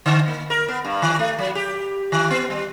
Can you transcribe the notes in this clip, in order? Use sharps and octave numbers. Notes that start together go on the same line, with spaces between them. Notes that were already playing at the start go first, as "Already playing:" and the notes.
D3
A#3
A#4
B3
G2
D#3
A3
F#3
G4
D#3
B3
G3